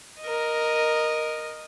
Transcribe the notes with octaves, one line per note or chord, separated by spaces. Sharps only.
A#4 D#5